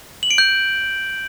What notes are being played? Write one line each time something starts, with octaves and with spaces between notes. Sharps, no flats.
F#7
D7
G6